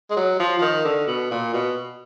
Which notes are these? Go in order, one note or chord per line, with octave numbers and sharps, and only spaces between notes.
G#3
F#3
F3
F3
D#3
D3
B2
A#2
B2